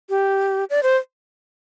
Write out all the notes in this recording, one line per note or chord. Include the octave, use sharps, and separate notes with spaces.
G4
D5
C5